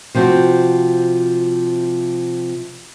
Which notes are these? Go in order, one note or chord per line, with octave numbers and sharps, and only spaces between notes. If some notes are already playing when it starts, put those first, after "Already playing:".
C3 F3 C4 F#4